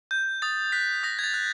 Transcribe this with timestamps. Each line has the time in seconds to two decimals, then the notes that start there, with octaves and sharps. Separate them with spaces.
0.11 G6
0.42 D#6 A6
0.72 F#6 B6
1.03 D#6 A#6
1.19 G#6
1.24 A6
1.34 F#6